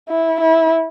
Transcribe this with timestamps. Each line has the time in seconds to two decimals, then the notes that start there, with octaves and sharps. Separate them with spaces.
0.09 E4
0.41 E4